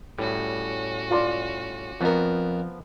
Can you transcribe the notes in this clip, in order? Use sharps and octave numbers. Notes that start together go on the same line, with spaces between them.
A2 G3 C#4 F#4
F4 D5 C6
F2 F3 B3 A#4